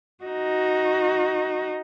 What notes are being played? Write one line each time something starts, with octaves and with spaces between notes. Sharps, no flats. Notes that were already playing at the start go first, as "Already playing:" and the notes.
D#4 F#4